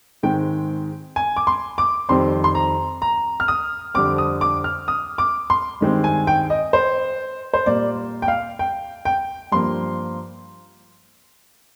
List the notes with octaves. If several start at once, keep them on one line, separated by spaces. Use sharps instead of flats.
G#2 D#3 G#3 C4 G5
G#5
D6
C6
D6
F2 D#3 G3 C4 C6
C6
A#5
A#5
F6
D#6
F2 D3 G3 C4 D6
D#6
D6
F6
D#6
D6
C6
G2 D#3 G#3 C4
G#5
G5
D#5
C5
C5
A#2 G3 A#3 D5
G5
F5
G5
G5
G2 F3 A#3 C6